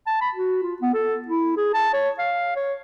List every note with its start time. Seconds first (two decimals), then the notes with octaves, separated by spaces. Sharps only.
0.07 A5
0.21 B5
0.35 F#4
0.63 F4
0.82 B3
0.94 A4
1.28 E4
1.57 G#4
1.74 A5
1.94 C#5
2.19 F5
2.56 C#5